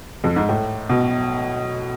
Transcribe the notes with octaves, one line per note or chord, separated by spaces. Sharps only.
F2
G#2
A2
B2